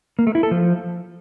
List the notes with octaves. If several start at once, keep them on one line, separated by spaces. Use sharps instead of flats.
A#3
A3
E4
A4
F3